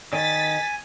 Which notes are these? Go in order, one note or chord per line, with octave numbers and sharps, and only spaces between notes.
D#3 D5 G#5 A6 B6